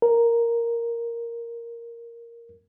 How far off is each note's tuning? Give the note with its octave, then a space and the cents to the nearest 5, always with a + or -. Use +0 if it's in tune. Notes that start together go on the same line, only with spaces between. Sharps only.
A#4 +0